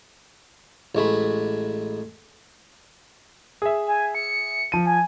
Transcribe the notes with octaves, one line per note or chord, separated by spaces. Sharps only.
A1 G#3 A3 B5
G#4 E5
G#5
C#7
F3 D#7
G#5